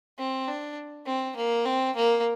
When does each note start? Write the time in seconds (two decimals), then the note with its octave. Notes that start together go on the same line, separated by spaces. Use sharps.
0.18 C4
0.48 D4
1.06 C4
1.36 A#3
1.65 C4
1.96 A#3